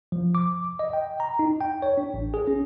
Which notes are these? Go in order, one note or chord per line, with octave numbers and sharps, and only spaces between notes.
F3
D6
D#5
G5
A#5
D#4
G5
C#5
D4
A1
G#4
C#4